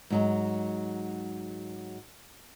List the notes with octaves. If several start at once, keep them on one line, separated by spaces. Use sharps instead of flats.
G#2 F#3 G#3